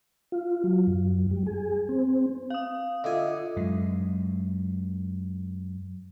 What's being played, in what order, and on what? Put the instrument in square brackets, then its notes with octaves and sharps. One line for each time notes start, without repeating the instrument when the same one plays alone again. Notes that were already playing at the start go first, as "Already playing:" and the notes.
[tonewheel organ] F4
F#3
F#2
G3
G#4
C4
[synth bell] F5 D#6
[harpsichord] D3 G#5 [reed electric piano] F4 D#5 E5
[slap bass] F#2 G#3